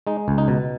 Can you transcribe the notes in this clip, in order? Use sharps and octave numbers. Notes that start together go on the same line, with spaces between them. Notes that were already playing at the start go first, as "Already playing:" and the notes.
G#3 D#4
C#2
D#4
B2